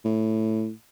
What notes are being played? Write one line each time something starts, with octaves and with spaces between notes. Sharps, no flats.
A2